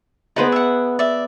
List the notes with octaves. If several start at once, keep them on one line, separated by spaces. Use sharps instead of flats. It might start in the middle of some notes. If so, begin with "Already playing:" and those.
B3 D#4 G#4 B4 C5 D5
E5 F#5
D5 E5